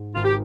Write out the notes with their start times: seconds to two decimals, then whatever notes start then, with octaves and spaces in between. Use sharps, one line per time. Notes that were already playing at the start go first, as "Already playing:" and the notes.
Already playing: G#2
0.15 G#1 F4
0.25 G4